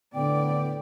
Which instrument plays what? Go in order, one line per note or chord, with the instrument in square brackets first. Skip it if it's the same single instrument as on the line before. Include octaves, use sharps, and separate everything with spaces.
[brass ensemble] A2 B3 [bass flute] D3 [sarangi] D5 [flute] G5